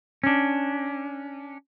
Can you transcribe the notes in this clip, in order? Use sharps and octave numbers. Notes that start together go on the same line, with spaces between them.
C#4 D4